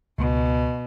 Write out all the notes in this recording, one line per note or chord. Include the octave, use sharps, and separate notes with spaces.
C#2 B2